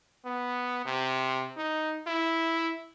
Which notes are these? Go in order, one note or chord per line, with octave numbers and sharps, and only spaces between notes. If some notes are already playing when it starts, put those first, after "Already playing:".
B3
C3
D#4
E4